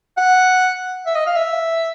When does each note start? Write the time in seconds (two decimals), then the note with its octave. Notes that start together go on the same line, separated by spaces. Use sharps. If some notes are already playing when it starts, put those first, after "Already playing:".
0.17 F#5
1.06 E5
1.15 D#5
1.26 F5
1.36 E5